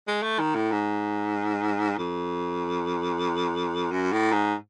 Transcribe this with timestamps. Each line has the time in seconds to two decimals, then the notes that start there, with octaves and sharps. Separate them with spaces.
0.08 G#3
0.23 A3
0.39 D#3
0.55 A2
0.72 G#2
1.99 F2
3.91 F#2
4.12 A2
4.32 G#2